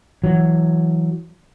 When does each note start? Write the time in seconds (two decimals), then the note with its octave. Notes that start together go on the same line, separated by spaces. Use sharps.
0.24 E3 F#3